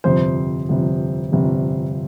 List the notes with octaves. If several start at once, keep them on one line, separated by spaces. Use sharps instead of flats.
G1 F2 C3 C5
G1 F2 C3
G1 F2 C3